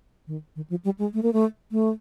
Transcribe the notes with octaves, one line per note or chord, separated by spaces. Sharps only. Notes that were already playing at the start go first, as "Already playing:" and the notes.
D#3
D#3
F3
G3
G#3
A3
A#3
A3
A3